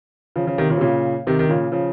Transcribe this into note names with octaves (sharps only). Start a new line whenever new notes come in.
C#3 F3
C#3 F3
C3 D#3
A#2 C#3
C3
A#2 C#3
C3 D#3
D#3
A#2 C#3
C#3 F3